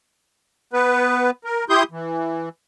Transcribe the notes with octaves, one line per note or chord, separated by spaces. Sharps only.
B3 B4
A#4
E4 G4 C6 D#6 G6
E3